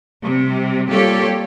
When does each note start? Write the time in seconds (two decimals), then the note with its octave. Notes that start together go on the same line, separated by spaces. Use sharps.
0.23 C3 G3
0.89 G3 A#3 F4 G4 A4 C#5